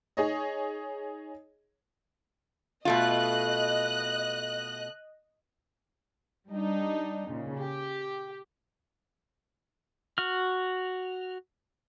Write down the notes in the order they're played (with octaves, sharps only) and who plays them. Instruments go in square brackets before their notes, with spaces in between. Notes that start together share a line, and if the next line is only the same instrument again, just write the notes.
[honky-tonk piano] D#4 G#4 C#5 D#5
[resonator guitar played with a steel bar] B2 A3 F4 [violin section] D#5 F#6
[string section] G3 D4 D#4
A#2 C#3
G4
[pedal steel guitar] F#4 F6